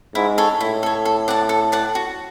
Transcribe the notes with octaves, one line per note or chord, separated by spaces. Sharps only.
G#2 E4
A4 C#5
A2 E4
A4 C#5
A4
D5 F#5 A5
A4
D5 F#5 A5
F#4